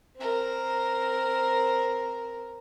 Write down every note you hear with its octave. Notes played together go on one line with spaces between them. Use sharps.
C4 A#4